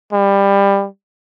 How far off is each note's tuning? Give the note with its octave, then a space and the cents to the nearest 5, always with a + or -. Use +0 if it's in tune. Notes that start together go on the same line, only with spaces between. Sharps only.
G3 +20